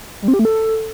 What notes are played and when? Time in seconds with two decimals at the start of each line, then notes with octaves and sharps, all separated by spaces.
0.22 G3
0.28 C4
0.34 G4
0.39 A3
0.45 A4